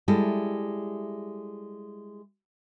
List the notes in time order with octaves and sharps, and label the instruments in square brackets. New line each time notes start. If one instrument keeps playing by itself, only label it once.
[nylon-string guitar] G3 G#3 E4 A4